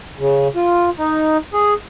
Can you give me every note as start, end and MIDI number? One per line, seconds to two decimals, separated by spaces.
0.19 0.48 49
0.56 0.90 65
0.98 1.38 63
1.53 1.74 68